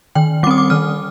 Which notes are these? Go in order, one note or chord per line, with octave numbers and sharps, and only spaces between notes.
D#3 G5
G3 C4 D6 D#6
D6
D#3 F6